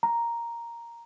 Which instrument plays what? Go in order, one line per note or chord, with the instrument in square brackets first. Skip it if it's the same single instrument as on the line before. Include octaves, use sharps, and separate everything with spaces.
[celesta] A#5